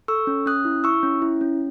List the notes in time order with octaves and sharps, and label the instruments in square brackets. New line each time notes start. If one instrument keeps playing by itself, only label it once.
[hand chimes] A4 C#6 E6
C#4
C#4 D#6 F#6
E4
E4 C#6 E6
C#4
E4
C#4